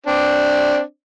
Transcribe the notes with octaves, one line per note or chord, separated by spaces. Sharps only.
C4 D4 D5